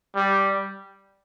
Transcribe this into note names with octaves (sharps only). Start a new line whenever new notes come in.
G3